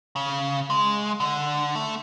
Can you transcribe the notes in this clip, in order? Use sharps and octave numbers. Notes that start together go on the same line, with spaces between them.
C#3
G#3
D3
A3